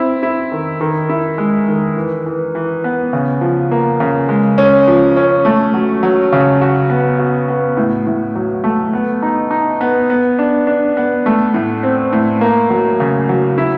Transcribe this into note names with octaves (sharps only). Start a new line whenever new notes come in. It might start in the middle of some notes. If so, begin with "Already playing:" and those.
Already playing: C4 E4
E4
D#3
D#3
E4
G#3
D#3
E3
E3
E3
B3
C#3
F3
A#3
C#3
G#3
C#4
F3
C#4
A3
F#3
F#3
C#3
F#4
B3
F#4
B3
A2
A2
F#3
A3
B3
D#4
D#4
B3
B3
D4
D4
B3
A3
A2
C4
A2
A#3
F#3
C#3
F#3
E4